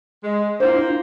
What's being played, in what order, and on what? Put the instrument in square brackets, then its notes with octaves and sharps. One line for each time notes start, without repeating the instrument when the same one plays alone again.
[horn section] G#3
[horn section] A#3 [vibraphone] D4 E4 F4 [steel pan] C5 F5